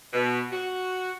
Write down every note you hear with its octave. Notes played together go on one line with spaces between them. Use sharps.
B2
F#4